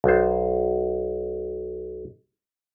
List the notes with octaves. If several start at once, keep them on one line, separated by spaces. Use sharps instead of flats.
B1 C5